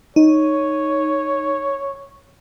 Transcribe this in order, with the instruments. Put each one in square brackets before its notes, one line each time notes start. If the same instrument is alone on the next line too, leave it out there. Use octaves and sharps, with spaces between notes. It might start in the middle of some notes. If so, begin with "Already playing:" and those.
[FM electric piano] D#4 [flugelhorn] C#5